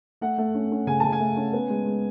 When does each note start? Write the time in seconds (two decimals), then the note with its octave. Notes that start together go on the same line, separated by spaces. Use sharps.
0.21 A3 F#5
0.38 A3
0.54 C#4
0.72 C#4
0.87 C#3 G#5
1.00 C#3 A5
1.12 G#5
1.20 A3
1.37 C#4
1.53 B3
1.70 G#3
1.86 G#3